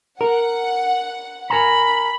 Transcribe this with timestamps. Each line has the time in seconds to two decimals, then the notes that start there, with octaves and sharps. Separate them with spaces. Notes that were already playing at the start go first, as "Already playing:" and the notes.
0.21 A#4 F#5
1.50 A#4 G#5 A#5 B5